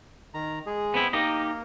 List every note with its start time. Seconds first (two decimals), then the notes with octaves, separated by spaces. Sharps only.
0.34 D#3 A#5
0.66 G#3 G#4
0.94 B3 C4 E4
1.13 A#3 D#4 G4 D#5